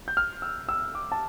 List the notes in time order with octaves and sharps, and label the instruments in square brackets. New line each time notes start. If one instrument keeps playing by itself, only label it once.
[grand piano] G6
F6
E6
E6
D6
A5